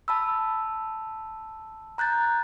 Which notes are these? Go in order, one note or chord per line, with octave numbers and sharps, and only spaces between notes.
A5 B5 E6
A#5 F#6 G6 A6